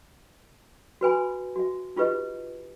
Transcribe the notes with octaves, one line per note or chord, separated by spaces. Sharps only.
F#4 B4 G#5 B5
F#4 E5
D#4 F4 G4 B4 D#5